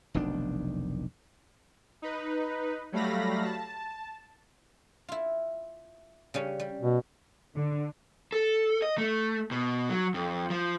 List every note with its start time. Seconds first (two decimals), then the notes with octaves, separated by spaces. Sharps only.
0.14 F1 B1 D#3 D4
2.02 D#4 B4
2.92 F#3 G3 A3 F5 B5 A#6
3.45 A5
5.09 E4 F4
6.34 C#3 G3 C#4
6.60 G3
6.82 B2
7.55 D3
8.32 A4
8.82 D#5
8.98 A3
9.51 B2
9.90 F#3
10.14 F2
10.50 F3